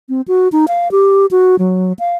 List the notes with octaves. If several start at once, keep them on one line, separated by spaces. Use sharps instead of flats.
C4
F#4
D#4
F5
G4
F#4
F#3
F5